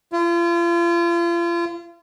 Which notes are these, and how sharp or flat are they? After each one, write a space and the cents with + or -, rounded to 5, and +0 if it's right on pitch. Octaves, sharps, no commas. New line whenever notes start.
F4 -40